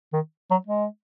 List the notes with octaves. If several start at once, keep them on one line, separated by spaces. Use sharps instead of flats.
D#3
F#3
G#3